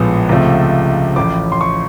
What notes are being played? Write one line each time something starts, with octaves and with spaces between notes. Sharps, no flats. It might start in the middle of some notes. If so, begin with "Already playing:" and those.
Already playing: A#1 A2 F3 G#3 B3
C#2 C3 F3 A3
A1 A2 F3 D6
C6
C#6